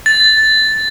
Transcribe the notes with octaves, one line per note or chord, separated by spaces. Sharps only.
A6